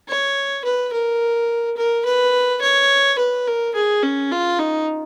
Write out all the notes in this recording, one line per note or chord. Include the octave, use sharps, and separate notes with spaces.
C#5
B4
A#4
A#4
B4
C#5
B4
A#4
G#4
C#4
F4
D#4